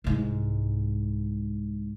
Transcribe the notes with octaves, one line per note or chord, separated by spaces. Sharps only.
C2 G#2